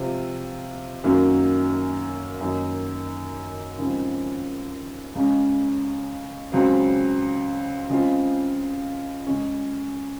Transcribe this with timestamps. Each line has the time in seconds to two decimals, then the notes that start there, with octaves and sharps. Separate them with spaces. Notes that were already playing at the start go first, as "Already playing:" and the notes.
Already playing: C3 F3 G#3 C4 F4
1.04 F#2 D#3 F#3 A#3 C#4
2.41 F#2 D#3 A#3 D#4
3.78 D#2 C#3 F3 G#3 C4
5.15 C#2 C#3 G#3 C#4
6.52 C#2 C#3 F#3 C4
7.90 C#3 G#3 C4 F4
9.27 C#3 G#3 C#4